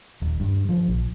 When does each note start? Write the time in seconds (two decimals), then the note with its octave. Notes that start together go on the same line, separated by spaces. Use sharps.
0.22 D#1
0.40 G2
0.69 F3
0.88 A#1